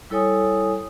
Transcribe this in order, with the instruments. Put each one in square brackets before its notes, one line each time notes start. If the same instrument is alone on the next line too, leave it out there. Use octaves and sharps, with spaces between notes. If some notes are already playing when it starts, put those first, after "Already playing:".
[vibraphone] G3 E4 A4 C#5 G#5 D#6